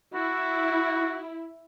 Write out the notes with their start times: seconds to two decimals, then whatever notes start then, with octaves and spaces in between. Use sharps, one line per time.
0.14 E4 F#4